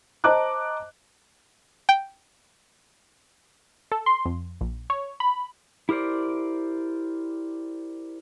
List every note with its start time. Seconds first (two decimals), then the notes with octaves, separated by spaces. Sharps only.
0.24 C5 D#5 A5 A#5 D6 F#6
1.89 G5
3.92 A4
4.06 C6
4.25 F2
4.61 A#1
4.90 C#5
5.20 B5
5.89 E4 G4 A#4 C5 D5